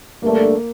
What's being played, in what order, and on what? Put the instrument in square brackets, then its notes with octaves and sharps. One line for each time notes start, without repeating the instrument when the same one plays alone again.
[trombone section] G2 D3 A3 D4 [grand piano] A#3